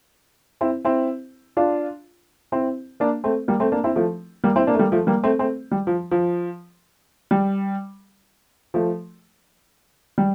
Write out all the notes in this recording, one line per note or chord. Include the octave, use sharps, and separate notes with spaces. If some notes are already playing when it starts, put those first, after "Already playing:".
C4 E4
C4 E4
D4 F4
C4 E4
A#3 D4
A3 C4
G3 A#3
A3 C4
A#3 D4
C4 E4
F3 A3
G3 A#3
C4 E4
A#3 D4
A3
G3 A#3
F3 A3
G3 A#3
A3 C4
A3 C4
G3
F3
F3
G3
F3 A3
G3